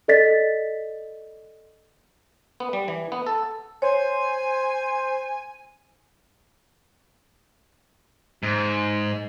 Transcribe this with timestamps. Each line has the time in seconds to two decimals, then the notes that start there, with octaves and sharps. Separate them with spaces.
0.08 A4 D5 D#5 A6 B6
2.60 B3
2.73 G3
2.88 E3
3.12 B3
3.27 A4
3.82 C5 C#5 G#5
8.43 G#2